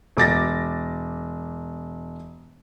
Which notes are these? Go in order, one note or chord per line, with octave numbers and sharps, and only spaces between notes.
E1 D6 A6 A#6